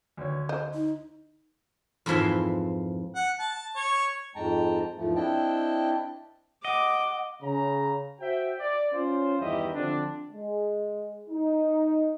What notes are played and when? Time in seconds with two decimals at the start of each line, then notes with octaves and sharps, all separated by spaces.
0.17 D2 C#5
0.49 C5 D#5
0.74 D#4
2.06 F2 G#2 E3 F3 E5 C6
3.15 F#5
3.39 A5
3.75 C#5
4.35 F2 G#2 G#3 G5 A5 A#5
4.97 E2 G#2 F3 A3
5.16 C4 D4 E4 D#5 G5 A5
6.65 D#5 F#5 D6
7.42 C#3 A#5
8.20 F#4 C5 E5 G5
8.58 D5
8.93 C#4 F4 C5
9.39 E2 G2 D#3 E4 G4 D#5
9.74 D3 F3 C4 D4
10.31 G#3
11.30 D#4